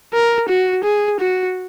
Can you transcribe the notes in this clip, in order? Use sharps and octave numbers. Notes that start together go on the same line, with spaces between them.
A#4
F#4
G#4
F#4